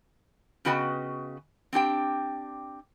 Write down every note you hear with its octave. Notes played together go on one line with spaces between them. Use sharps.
C#3 B3 F#4 B4 D#5 G5
C4 D4 G4 G5